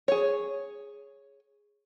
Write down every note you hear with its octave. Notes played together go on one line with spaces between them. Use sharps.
G#4 C#5